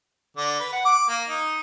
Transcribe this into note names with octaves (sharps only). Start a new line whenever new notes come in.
D3
B4
F#5
D6
A#3
D#4